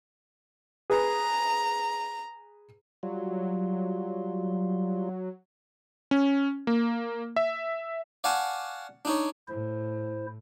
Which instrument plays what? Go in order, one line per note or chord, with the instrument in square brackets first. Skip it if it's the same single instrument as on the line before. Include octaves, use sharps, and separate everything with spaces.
[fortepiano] G#4 B4 [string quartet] A#5
[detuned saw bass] F#3 [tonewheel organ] G3 F4
[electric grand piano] C#4
A#3
E5
[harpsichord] D5 F5 F#5 G#5 A5 C#6
D4 D#4 C#5
[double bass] A2 [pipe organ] E4 C5